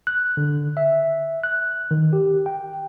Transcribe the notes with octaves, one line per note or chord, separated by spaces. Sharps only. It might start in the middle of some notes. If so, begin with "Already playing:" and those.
F#6
D3
E5
F#6
D#3
G4
G5